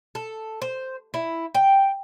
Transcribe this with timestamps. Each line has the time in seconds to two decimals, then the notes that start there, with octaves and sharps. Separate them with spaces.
0.15 A4
0.62 C5
1.14 E4
1.55 G5